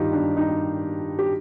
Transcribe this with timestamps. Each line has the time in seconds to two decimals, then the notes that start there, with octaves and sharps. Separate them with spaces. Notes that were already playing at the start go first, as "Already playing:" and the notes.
Already playing: G2 D#3 G3 D#4 F4 G4
0.13 D4
0.37 D#4
1.19 G4